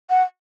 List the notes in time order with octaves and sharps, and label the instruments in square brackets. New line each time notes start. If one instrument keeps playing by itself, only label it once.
[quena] F#5